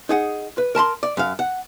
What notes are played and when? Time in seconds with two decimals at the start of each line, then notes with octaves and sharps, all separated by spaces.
0.09 D#4 G#4 F#5
0.58 B4
0.75 A#4 A5 B5 C6
1.03 D5
1.17 F#2 F5
1.39 F#5